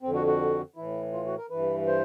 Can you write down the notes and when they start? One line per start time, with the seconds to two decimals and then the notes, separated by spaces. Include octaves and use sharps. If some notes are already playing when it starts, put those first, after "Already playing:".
0.02 F2 D3 C4
0.15 F#4
0.27 F#4
0.76 A2 E3 E4
1.13 F4
1.26 F#4
1.38 A#4
1.50 G2 E3 B4
1.87 C5